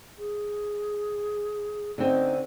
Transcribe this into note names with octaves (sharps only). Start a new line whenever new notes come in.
G#4
D3 C4 C#4 D#4